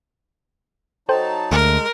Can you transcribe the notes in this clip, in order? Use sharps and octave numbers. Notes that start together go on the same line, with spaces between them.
F#3 D#4 A4 C5 G5 A5
D2 G#3 A#4